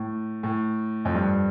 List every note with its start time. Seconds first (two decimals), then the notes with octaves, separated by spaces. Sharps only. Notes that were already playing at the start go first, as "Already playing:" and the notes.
Already playing: A2
0.43 A2
1.05 F2
1.14 G2